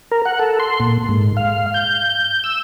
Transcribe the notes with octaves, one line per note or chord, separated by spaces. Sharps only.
A#4
F#5
A4
C6
A#2
G#2
F5
G6
E6